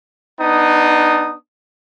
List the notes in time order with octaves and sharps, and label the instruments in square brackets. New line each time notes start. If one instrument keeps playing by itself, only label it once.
[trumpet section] B3 D4 D#4 D#6